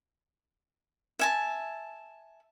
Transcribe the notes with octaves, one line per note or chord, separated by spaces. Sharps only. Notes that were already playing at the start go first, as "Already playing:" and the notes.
E5 G#5 A5